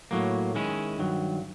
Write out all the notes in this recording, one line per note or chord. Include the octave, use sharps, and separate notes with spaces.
A2 F#3 A#3
D#3 G#3 C#4 E4
G2 D#3 F#3